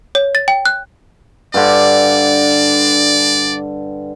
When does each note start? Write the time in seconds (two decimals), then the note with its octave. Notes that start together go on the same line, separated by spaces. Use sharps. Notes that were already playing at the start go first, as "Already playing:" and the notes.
0.15 C#5
0.35 A6
0.48 G5
0.66 F#6
1.54 G2 D3 D5